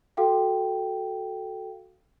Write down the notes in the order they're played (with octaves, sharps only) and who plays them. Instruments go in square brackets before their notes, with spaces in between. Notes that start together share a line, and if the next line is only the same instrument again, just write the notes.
[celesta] F#4 A4 F5 G5